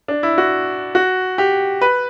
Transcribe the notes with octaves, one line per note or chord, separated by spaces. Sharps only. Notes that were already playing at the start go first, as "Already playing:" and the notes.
D4
E4
F#4
F#4
G4
B4